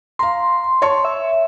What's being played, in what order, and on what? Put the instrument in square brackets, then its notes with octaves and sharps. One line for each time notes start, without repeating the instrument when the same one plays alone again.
[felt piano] F5 A#5 [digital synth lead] C6
[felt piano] C#5 A5 C#6
[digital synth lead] E5